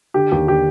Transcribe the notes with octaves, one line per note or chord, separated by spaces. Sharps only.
D3 G4
D#2 G4
D3 G4